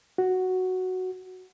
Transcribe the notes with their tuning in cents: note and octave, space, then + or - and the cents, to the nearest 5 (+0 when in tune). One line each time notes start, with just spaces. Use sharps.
F#4 +0